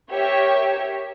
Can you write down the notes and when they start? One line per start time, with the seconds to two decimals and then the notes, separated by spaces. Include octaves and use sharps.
0.10 G4 A#4 C#5 E5